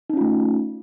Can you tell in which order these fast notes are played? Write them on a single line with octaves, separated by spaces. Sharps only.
D#4 C#4 F4 A3